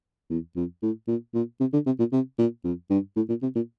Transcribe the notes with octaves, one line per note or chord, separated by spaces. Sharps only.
E2
F2
A2
A#2
A#2
C3
D3
C3
A#2
C3
A#2
F2
G2
A2
A#2
C3
A#2